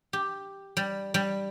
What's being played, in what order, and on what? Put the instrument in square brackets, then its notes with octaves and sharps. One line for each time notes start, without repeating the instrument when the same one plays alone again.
[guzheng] G4
G3
G3